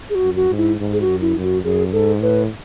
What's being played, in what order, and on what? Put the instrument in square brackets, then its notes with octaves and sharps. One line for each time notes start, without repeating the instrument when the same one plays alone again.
[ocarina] G#4
F#4
[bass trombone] F#2
[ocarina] F#4
[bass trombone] G#2
[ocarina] E4
[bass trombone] G#2
[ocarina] G#4
F#4
[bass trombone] F#2
[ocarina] E4
[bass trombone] F#2
[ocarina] F#4
[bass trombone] F#2 [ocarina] G#4
[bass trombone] G#2 [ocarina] A4
[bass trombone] A2 [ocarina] B4